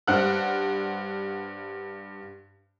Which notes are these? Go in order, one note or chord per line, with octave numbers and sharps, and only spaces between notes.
G2 C5 F#5 F6 F#6